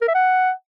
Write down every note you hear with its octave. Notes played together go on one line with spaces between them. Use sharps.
A#4
E5
F#5